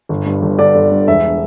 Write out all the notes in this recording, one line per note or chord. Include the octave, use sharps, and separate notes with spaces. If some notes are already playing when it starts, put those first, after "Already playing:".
G1
G2
G1
D3 D5
G1
G2
E1 E5